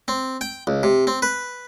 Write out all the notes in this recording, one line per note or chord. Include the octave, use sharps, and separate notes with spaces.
C4
G5
C#2
C3
C4
B4